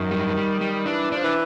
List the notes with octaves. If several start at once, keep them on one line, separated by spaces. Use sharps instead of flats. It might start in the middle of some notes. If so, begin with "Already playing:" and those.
Already playing: F#2 D#3
G3
G3
G3
E3 D4
F3 D4
E3